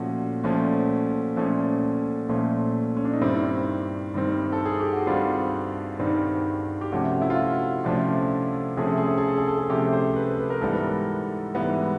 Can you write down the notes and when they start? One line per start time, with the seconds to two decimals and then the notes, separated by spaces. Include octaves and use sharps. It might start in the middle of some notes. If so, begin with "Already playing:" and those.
Already playing: A#2 F3 A3 C#4 F#4
0.44 A#2 F3 A3 C#4
1.36 A#2 F3 A3 C#4
2.29 A#2 F3 A3 C#4
2.97 C#4
3.05 D4
3.13 D#4
3.21 G2 D#3 G3 C4 E4
4.14 G2 D#3 G3 C4
4.52 A4
4.65 G#4
4.80 G4
4.93 F#4
5.07 G2 D#3 G3 C4 F4
5.99 G2 D#3 G3 C4
6.81 G4
6.92 C3 F3 A3 C#4 F#4
7.22 E4
7.30 F4
7.38 F#4
7.84 C3 F3 A3 C#4 D4
8.77 C3 F3 A3 C#4 G#4
8.87 A4
8.97 G#4
9.07 A4
9.18 G#4
9.28 A4
9.38 G#4
9.48 A4
9.58 G#4
9.69 C3 F3 A3 C#4 G4
9.93 C5
10.16 B4
10.39 B4
10.50 A#4
10.61 G#2 E3 G3 B3 A4
10.73 A#4
11.55 G#2 E3 G3 B3